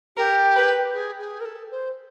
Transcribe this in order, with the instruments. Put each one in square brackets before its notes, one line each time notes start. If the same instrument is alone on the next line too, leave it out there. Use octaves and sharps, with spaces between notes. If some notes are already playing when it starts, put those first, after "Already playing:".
[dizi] G4 [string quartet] A#4
[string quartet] B4
[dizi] G#4
G#4
A#4
A4
C5